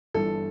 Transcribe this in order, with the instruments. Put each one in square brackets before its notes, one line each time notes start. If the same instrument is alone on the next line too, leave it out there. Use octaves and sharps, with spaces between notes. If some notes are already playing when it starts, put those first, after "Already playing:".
[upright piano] G1 G2 E3 A4